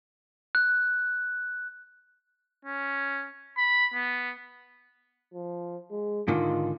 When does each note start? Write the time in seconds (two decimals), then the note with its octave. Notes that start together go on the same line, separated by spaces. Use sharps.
0.55 F#6
2.65 C#4
3.57 B5
3.94 B3
5.34 F3
5.91 G#3
6.28 G#2 D3 D#3 F4